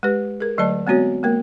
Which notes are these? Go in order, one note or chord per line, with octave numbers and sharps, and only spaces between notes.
G#3 G4 B4
G#4 A#4
D3 F#3 A3 D5 D#5 A5
G#3 B3 C4 F#4 C#5
G#3 A#3 A#4